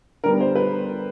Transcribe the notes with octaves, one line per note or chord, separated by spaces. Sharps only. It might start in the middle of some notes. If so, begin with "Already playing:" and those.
D3 G3 B3 A#4
C5
B4